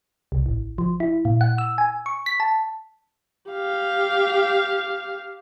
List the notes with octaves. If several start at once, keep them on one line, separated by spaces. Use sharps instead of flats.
C2
A1
F3
E4
A#2
F#5
E6
G#5
C#6
B6
A5
G4 F5